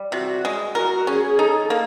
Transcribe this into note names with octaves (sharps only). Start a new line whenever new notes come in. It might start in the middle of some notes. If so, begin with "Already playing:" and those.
Already playing: G3
C3 F#4
G#3
F#4 A#4
C#4 G#4
D#4 A4
A#3